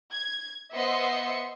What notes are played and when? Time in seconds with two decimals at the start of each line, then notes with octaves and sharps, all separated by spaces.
0.13 G#6
0.74 B3 C5 D#5 E5 C6 C#7